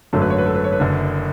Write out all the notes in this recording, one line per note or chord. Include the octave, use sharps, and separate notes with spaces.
G#1 F#2 D3 F#3 A3 A4
B4
C#5
B4
A4
B4
C#5
B4
F#1 F#2 D3